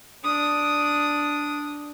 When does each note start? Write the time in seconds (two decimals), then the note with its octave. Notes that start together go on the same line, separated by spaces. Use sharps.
0.24 D4 D#6